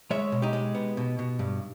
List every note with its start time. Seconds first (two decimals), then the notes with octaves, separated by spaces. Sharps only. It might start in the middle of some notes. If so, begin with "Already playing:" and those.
0.11 G#3 C#5 E5
0.32 B2
0.42 D#4 G4
0.53 G#3
0.75 B3
0.97 B2
1.19 B2
1.39 G2